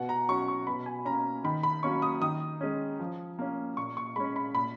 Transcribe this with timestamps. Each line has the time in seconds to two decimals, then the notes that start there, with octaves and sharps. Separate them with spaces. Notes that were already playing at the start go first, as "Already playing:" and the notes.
Already playing: B2 F#5
0.09 A#5
0.29 F#3 C#4 C#6
0.48 C#6
0.67 B2 B5
0.86 G#5
1.05 A#3 C#4 A#5
1.44 D#3 B5
1.63 B5
1.83 F#3 A#3 C#4 C#6
2.02 D#6
2.22 D#3 D#6
2.61 G#3 C#4
3.00 F3
3.39 A#3 C#4
3.77 A#2 C#6
3.97 C#6
4.16 G#3 C#4 B5
4.36 B5
4.55 A#2 B5